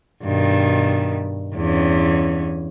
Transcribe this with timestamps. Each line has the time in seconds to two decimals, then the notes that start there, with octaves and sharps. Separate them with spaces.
0.24 G2 B2 D#3
1.54 E2 G2 C#4